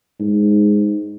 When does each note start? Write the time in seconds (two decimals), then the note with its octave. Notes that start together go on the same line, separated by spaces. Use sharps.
0.20 G#2